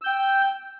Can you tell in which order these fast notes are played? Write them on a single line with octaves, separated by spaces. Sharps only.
E6 G6 G5